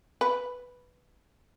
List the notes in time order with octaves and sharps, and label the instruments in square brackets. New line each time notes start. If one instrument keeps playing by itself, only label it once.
[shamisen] B4